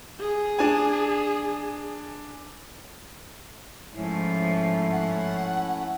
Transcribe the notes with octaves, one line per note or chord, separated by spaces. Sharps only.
G#4
D4 G#5
G#2 F3 A3 C#4 E4
F#5